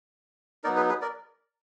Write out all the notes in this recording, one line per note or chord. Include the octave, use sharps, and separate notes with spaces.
F#3 B3 D#4 A#4 D5
G#4 B4
G#4 B4
A#4 D5